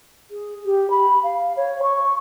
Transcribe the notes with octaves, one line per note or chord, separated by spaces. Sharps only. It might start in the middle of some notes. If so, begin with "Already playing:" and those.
G#4
G4
B5
F5
C#5
C#6